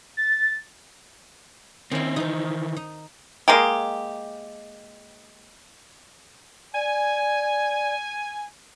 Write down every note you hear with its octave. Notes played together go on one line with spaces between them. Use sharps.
A6
D#3 C4 C#4 E4
D#3 E3 D#4 C5
D#4
G#3 A#3 G4
D5 G#5